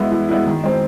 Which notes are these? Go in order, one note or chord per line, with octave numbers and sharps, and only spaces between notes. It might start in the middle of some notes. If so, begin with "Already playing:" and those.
Already playing: E3 G#3 B3 E4
E3
G#3 B3 E4
D#3
G#3 C4